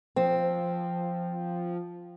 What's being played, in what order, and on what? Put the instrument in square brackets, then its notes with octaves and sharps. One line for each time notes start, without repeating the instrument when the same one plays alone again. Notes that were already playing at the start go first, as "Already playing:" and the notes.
[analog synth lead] F3 [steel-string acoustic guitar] C4